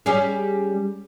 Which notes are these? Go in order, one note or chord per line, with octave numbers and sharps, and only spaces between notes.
G3 C#4 G#4